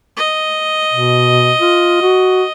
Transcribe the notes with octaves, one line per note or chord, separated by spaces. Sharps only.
D#5
B2
F4
F#4